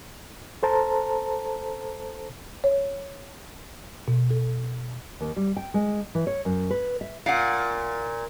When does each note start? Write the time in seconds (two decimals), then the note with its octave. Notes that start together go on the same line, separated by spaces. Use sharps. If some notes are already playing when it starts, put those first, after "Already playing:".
0.63 A4 C5 A5 A#5
2.64 C#5
4.08 B2
4.31 A4
5.21 D#2
5.36 G3
5.57 G5
5.74 G#3
6.15 E3
6.27 C#5
6.45 F#2
6.71 B4
7.01 E5
7.26 A#2 F5 F#5